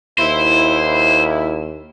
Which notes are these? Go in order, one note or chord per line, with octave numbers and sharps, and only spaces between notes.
D#2 E4 C5